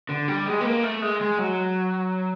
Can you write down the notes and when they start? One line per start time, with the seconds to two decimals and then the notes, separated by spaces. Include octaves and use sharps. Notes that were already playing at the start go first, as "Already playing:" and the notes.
0.09 D3
0.28 G3
0.46 G#3
0.61 B3
0.65 A#3
0.83 A3
1.02 G#3
1.21 G#3
1.38 F#3